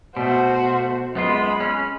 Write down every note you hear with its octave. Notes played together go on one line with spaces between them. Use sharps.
B2 A3 F#4 C5
F#2 G#3 B3 F4 B5
C#4